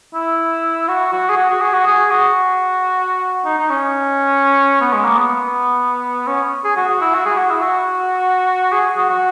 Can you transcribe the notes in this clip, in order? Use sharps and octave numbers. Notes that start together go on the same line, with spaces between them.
E4
F#4
F#4
G#4
F#4
F#4
G#4
F#4
G#4
F#4
D#4
D#4
C#4
B3
G#3
A#3
B3
C#4
G#4
F#4
F#4
E4
F#4
G#4
F#4
E4
F#4
G#4
F#4
F#4